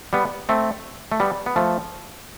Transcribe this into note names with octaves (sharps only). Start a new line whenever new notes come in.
G3 B3
A3 C4
A3
G3 B3
B3
F3 A3